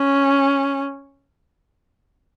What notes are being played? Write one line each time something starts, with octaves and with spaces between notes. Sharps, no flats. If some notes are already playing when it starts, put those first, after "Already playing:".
Already playing: C#4